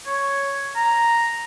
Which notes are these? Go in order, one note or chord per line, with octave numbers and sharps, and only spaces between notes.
C#5
A#5